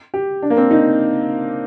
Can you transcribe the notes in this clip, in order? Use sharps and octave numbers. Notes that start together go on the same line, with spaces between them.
G4
D4
A#3
C4
D#4